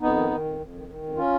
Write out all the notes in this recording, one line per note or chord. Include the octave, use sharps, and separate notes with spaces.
F2 B3 D#4
D#3
D#3
F2
F2
D#3
D#3
F2
C#4 F4